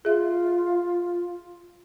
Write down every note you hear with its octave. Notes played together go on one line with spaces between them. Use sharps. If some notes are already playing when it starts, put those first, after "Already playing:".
F4 G#4 E5